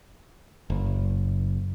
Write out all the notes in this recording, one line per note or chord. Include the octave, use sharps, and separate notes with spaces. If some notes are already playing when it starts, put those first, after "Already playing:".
F#1